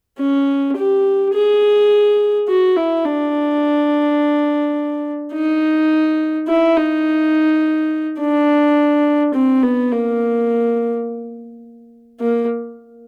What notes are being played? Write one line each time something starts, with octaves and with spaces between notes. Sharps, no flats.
C#4
G4
G#4
F#4
E4
D4
D#4
E4
D#4
D4
C4
B3
A#3
A#3